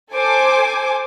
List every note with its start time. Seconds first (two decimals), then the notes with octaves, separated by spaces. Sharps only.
0.13 A4 C5 G#5 D6